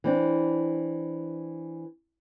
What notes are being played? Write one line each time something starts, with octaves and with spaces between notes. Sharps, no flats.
E3 C4 D4